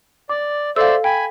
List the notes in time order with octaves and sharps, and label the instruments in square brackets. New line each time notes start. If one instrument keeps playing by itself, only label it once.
[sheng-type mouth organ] D5 [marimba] D6
[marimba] A4 [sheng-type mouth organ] C5 D5 E5 [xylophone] F5 E6
[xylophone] G5 [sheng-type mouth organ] G#5 B5